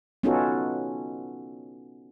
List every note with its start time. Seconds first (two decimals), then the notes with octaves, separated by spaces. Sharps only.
0.23 B3 C#4 D#4 F4 F#4 A4